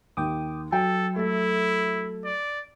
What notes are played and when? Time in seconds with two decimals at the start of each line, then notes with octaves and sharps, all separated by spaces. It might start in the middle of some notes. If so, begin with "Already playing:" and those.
0.17 D#2 G5 D6 D#6
0.72 F#3 A4 G5
1.16 A3 E4 A4
2.25 D5